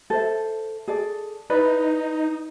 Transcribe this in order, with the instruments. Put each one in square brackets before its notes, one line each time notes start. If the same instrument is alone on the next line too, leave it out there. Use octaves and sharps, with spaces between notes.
[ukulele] A4 C5 E5
G#4 A4 D5
[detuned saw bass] D#4 [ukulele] E4 B4 D5